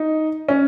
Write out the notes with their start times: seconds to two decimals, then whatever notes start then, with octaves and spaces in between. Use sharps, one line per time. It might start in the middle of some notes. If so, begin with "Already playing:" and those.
Already playing: D#4
0.48 C#4